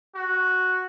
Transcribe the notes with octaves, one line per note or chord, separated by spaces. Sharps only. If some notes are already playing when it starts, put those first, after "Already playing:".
F#4